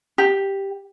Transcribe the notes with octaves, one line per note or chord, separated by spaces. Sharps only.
G4